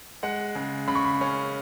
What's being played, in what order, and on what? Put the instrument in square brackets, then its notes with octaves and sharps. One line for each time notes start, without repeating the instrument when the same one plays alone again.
[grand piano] G#3 F#5
C#3
C#3 B5
C#6
B5
C#4